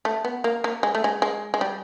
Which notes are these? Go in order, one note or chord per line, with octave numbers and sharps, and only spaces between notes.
A3
B3
A#3
A#3
G#3
A3
G#3
G#3
G#3
G3